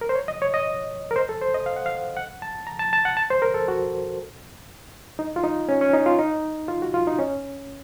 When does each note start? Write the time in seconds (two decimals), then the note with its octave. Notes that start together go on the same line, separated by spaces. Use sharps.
0.01 A#4
0.09 C5
0.15 C#5
0.28 D#5
0.42 C#5
0.54 D#5
1.11 A#4
1.16 C5
1.29 A4
1.41 C5
1.54 D#5
1.66 F5
1.76 F#5
1.86 F5
2.17 F#5
2.42 A5
2.67 A#5
2.79 A5
2.93 A5
3.05 F#5
3.17 A5
3.30 C5
3.42 A#4
3.54 A4
3.68 F#4
5.19 D#4
5.36 F4
5.44 D#4
5.69 C#4
5.81 C#4
5.93 D#4
6.06 F4
6.19 D#4
6.68 F4
6.82 F#4
6.94 F4
7.07 D#4
7.19 C#4